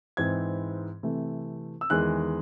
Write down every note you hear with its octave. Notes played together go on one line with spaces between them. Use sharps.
G#2 E3 C4 E4 G#6
C3 E3 A3
E6
E2 D#3 G#3 F#6